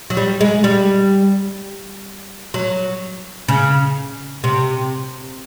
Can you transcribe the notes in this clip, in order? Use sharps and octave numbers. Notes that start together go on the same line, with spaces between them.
F#3
G3
G#3
G3
F#3
C#3
C3